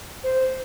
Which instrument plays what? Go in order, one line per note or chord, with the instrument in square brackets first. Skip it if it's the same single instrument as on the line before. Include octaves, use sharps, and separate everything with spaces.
[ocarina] C5